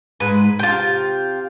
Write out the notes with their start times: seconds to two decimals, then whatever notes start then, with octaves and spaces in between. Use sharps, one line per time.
0.20 G#2 G#3 B4
0.59 C3 F4 G5